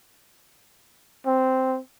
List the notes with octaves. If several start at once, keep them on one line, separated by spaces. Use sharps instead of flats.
C4